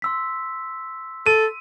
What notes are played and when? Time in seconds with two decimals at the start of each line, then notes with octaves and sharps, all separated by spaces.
0.02 C6 E6 B6
1.26 A4 D#7